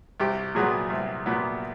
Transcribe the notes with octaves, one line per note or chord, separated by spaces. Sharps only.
C2 G4
A#2 F#3 B3 G#4
C2
A#2 F#3 B3